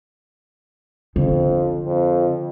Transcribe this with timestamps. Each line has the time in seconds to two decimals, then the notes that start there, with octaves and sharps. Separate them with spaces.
1.16 F2 D3
1.86 F2